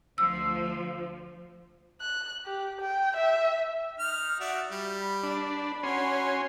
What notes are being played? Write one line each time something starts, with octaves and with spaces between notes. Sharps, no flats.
D2 F3 E6
F#6
G4
G5
E5
D#4 F6
F#4 D5 E5
G3
B5
D4
C#4 F#4 G#5 C6